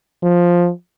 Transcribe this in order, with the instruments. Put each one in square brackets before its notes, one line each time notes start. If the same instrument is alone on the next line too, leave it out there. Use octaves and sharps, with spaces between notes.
[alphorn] F3